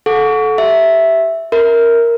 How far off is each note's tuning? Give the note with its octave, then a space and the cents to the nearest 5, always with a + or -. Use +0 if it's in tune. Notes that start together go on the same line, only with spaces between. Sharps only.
A4 -20 F#5 -30 C#6 +30
G4 -10 E5 +0
A#4 +0 E5 -20 B5 +30